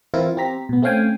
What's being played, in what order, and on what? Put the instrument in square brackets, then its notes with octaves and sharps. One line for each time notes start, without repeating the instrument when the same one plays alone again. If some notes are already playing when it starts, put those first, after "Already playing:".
[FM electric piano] E3 C4 E4 F4 A#4
C4 G4 A#5 B6
B2 B3
A3 C4 C#4 F5 G5 G#5